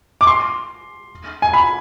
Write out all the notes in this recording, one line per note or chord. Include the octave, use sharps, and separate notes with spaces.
D6
C6
G#5
B5